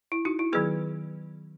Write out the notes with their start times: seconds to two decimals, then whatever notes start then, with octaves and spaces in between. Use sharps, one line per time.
0.12 E4
0.25 D#4 F#4
0.39 E4
0.53 D#3 F#3 B3 G#4 B4